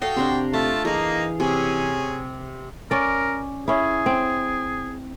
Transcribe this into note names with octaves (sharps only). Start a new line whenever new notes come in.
F#4 A4 D#5 F5 G5
C3 D4 A#5 C6
A3 F4 E5 A5
E3 A#3 D#4 G#4 F5 A#5
C3 C#4 G#4
C#4 A#4 D5
C#4 E4 G#4
C4